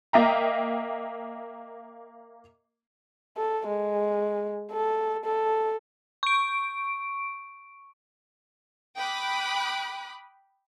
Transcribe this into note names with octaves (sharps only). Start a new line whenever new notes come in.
A#3 D#5 E5 G5 A#5
A4
G#3
A4
A4
C#6 D7
G5 B5 D6 D#6 F#6